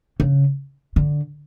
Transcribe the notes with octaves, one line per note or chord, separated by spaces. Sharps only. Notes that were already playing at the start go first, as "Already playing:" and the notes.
C#3
D3